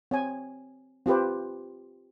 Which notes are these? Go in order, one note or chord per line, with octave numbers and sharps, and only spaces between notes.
C4 C#5 G#5
C4 F4 G4 B4 C5